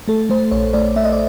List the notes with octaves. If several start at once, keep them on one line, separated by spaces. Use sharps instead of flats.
A3 A4
A3 C5
A#1 C#5
A3 D5
A3 E5
D#5
D5